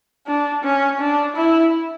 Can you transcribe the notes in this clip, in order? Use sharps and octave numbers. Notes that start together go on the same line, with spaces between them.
D4
C#4
D4
E4